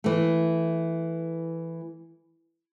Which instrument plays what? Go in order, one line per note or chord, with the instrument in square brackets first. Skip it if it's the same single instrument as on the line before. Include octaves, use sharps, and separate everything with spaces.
[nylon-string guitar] E3 A3